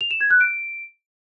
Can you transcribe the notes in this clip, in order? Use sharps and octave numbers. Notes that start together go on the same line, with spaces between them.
F7
E7
G#6
F#6
D7